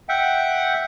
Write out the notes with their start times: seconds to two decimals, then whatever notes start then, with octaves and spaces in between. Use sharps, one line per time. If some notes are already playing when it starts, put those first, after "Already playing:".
0.09 E5 F#5 G5